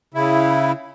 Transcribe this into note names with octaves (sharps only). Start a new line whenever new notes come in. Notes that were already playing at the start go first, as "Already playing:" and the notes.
C#3 E4